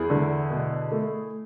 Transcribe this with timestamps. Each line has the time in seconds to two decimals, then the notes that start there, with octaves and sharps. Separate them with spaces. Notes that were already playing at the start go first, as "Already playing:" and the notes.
Already playing: E2 E4 G#4
0.10 D3
0.51 B2
0.92 A3